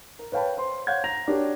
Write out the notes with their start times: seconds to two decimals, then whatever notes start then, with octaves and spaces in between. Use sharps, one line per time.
0.19 A#4
0.32 B4 C#5 F5 G5 A5 B5
0.57 C5 C6
0.87 C#5 F5 F#5 G6 G#6
1.04 A#5 A#6 F7
1.27 D4 F#4 G4 A#4 C#5